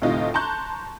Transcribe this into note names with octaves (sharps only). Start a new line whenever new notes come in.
D2 A2 C3 D#4 F4
A5 A#5 C6 C#6 F#6 G6